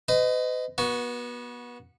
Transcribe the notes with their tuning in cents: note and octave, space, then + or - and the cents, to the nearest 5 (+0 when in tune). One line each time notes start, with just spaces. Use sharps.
B4 +45 D#5 +0
B3 -30 F#4 +0